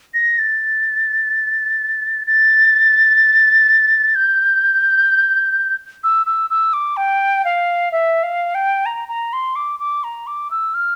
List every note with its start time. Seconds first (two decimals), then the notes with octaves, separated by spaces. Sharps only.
0.14 A#6
0.39 A6
2.27 A6
4.15 G6
6.04 E6
6.26 E6
6.50 E6
6.73 D6
6.97 G5
7.45 F5
7.92 E5
8.23 F5
8.55 G5
8.86 A#5
9.08 A#5
9.33 C6
9.56 D6
9.80 D6
10.04 A#5
10.27 D6
10.51 E6
10.74 F6